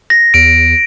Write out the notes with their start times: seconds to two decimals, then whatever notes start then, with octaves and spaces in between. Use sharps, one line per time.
0.10 A#6
0.34 E2 D7